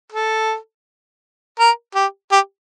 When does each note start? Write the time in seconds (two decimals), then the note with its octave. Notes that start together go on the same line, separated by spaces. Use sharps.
0.12 A4
1.59 A#4
1.95 G4
2.32 G4